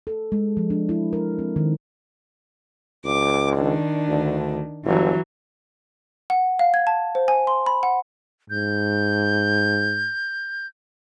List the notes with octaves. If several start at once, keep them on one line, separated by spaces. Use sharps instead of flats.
A4
G#3
F3
D4
E4
A#4
C4
D#3
C#2 D6
D#3 D4
D2
G1 E3 F#3
F#5
F5
G#6
A5
C5
G#5
C6
B5
F#5
G#2 G6